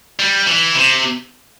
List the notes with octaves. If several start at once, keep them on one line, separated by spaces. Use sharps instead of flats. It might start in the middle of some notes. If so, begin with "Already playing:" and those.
G3
E3
C3